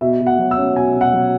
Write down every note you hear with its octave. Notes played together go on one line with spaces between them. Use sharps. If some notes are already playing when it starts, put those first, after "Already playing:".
B2 E5
B2
F#5
F#3
E6
C#4
B2 G#5
B2
F#5
F#3